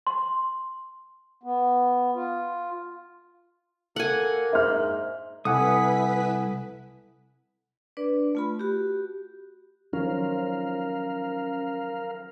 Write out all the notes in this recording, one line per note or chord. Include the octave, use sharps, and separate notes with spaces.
C6
B3
F4
A#3 A4 F#5 G#5
G#2 E5 C6 F6
C2 E4 A4 B4 F#5 G#5 D#6 B6
D4 B4 D5
A3 F4 B5
F#4 G4
D#3 F3 F#3 C#4 A#4 F5